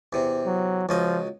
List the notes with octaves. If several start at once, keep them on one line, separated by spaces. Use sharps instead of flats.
E2 C3
F#3
C#2 F3 F#3 D#5